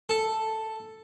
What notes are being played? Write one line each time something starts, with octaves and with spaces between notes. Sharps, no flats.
A4